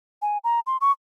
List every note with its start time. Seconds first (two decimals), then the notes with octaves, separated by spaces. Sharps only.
0.22 G#5
0.44 A#5
0.67 C6
0.81 C#6